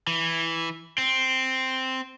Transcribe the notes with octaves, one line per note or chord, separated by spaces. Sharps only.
E3
C4